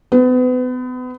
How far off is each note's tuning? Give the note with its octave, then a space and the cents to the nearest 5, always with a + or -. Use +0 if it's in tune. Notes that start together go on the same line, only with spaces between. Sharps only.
B3 +35